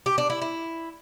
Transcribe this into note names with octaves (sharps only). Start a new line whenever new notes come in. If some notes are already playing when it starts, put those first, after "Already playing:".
G4
D4
E4
E4